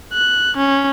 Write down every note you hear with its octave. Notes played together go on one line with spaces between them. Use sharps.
F#6
C#4